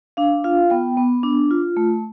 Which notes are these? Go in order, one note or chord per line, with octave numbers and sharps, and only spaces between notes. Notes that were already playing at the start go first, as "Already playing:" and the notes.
D4 F5
F4 F5
B3 G5
B3
D4
F4
A3